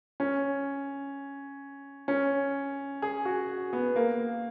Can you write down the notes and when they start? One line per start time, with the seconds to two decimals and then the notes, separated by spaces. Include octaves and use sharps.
0.20 C#4
2.08 C#4
3.02 G#4
3.25 F#4
3.73 B3
3.96 A#3